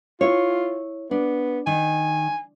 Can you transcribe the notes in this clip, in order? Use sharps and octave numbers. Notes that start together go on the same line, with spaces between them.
E4 F4 C#5
B3 D4
D#3 G#5